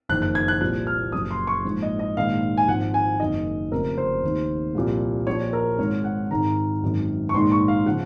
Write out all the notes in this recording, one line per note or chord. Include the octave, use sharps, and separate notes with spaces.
F#1 F2 D#3 F#6
F#6
G#6
F#6
C2 A#2 F3 F#6
F6
F#1 F#2 F3 D#6
C6
C#6
A#1 G#2 F3
D#5
D#5
A#1 G#2 D#3 F5
G#5
G#1 G#2 F3 F#5
G#5
F#1 F#2 D#3 D#5
F1 F2 C#3 F3 A#4
C5
D#2 D#3
C2 A#2 F3
A#1 A#2 F3 C#5
A#4
G#1 G#2 D#3 C#5
F#5
G#1 G#2 D#3 A#5
G#1 F#2 D#3
C#6
A#1 G#2 D#3 C6
C#6
F5
C#3 F3 F#5